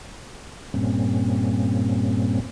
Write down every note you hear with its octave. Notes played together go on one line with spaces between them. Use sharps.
G2 A#2 G3 A#3 C4 C#4